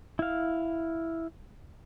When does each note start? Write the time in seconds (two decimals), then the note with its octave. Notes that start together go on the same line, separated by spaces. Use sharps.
0.19 E4 F5